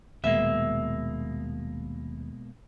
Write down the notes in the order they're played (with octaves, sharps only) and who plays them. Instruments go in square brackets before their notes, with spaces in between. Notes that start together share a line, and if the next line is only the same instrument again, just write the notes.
[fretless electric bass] D#1 [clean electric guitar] B2 G#3 A#3 [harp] E5